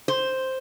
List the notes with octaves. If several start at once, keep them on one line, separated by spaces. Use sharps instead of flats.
C5